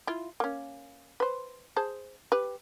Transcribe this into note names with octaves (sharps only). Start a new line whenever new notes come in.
E4 F4
A#3 C#4
B4 C5
G#4 C5 A5
G4 B4